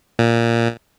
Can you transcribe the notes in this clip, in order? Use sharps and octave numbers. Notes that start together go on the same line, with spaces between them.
A#2